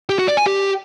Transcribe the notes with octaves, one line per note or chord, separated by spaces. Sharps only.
G4
F#4
D5
G#5
G4